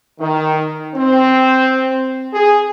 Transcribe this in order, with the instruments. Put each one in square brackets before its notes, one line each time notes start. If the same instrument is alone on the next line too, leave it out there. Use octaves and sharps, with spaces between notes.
[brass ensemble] D#3
C4
G#4